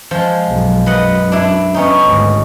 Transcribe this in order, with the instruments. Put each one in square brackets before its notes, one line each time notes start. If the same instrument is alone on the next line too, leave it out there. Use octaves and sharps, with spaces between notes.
[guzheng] F3 G#3
[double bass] B1 F#2
[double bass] F#2 [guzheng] B4 D#5 F#5
[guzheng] D4 E4
B3 C#4 D#4
[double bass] G#1 D2